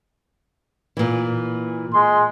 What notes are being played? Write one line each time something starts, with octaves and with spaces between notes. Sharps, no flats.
A#2 E3
G#3 C6